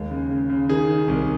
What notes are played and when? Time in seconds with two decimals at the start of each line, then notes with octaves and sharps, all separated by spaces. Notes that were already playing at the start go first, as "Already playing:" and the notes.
Already playing: D#2 G#3
0.11 C#3
0.30 C#3
0.50 C#3
0.69 D#3 G#4
0.88 D#3
1.08 C2